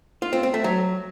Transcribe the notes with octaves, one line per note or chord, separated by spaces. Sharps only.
F4
C4
C4
A3
F#3